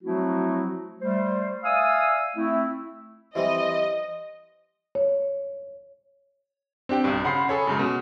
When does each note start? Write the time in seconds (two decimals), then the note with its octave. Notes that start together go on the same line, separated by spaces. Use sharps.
0.02 F3 F#3 A3 C4 E4 F#4
1.02 G3 A3 C5
1.64 D5 E5 F5 G#5 D#6 E6
2.36 A3 C4 E4
3.35 E3 G3 C4 D#5
4.95 C#5
6.89 C4 D4 G4 G5
7.04 B1 G2
7.24 C#3 F#5 B5 C6 C7
7.48 G#4 A4 C#5 B5
7.67 F#2 C#3 G#3
7.79 B2